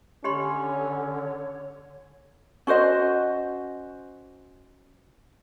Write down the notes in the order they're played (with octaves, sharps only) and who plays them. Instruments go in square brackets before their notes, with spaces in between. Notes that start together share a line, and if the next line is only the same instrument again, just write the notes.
[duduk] D3 [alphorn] C#4 [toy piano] G4 B5 C6 [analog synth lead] C#5
[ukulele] C#4 F#4 C5 D#5